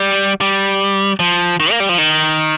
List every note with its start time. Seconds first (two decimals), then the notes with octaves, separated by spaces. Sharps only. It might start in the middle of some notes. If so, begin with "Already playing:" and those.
Already playing: G3
0.41 G3
1.20 F3
1.60 D#3
1.71 A#3
1.80 G3
1.89 F3
1.98 D#3